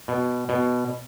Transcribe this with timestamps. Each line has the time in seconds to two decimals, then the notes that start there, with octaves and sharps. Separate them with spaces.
0.08 B2
0.49 B2